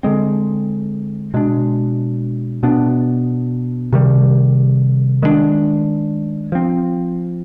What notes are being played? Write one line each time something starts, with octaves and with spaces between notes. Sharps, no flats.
D3 G#3 C4
B2 G#3 D4
B2 B3 D4
C3 D#3 G3
D#3 G#3 B3 D4
F3 C4